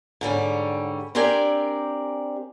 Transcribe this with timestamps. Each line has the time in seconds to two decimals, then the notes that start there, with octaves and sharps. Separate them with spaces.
0.21 G#2 D3 G3 C#4
1.15 C4 D4 G4 A#4 D5 G#5